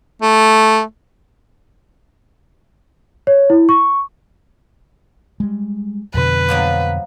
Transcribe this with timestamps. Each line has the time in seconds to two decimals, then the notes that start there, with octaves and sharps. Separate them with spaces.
0.22 A3
3.27 C#5
3.50 E4
3.69 C#6
5.40 G3 G#3
6.14 F2 B2 D3 B4
6.49 F3 F#3 A#3